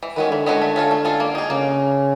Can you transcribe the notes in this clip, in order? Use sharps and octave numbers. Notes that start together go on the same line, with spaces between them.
E3
D#3 G#3 C#4 F#4 B4
D3 E3
G#3 C#4 F#4 B4
A3
C#4 F4 A4
A3
C#4 F4 A4
A#3
D#4 G#4
C#3 A#3